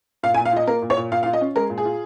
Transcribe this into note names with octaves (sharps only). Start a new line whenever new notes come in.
A#2 F5
G#5
A#2
F5
F4 D#5
A#3 A#4
A#2
C#5
A#2
A#2 F5
F5
F4
D#5
C#4
G#3 A#4
A#2
G#4
F4